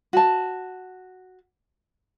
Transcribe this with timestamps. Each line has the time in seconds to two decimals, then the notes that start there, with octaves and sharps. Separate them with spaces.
0.13 F#4 A5